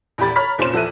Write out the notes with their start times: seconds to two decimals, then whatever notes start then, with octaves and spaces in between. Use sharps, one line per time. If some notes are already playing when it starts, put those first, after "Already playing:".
0.18 A#1 E2 G4 B5 A6
0.36 C#5 A#5 B5 F6 B6
0.58 F1 A#2 C4 C#4 C6 E7
0.73 E2 F3 A4 E5 F#6 D#7